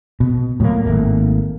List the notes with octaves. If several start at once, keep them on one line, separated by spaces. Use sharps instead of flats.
B2
A2 F#3 G3 A#3
G#1 E2 A3 A#3